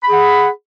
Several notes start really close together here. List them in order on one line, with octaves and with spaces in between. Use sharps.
B5 G#4 F#5